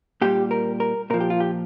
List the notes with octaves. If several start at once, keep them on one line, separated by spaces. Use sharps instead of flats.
A#2 G3 G4
A#4
A#4
A#2 F3 A#4
G4
F4
G4